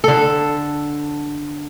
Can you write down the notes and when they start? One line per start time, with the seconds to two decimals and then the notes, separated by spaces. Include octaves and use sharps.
0.04 D3 A4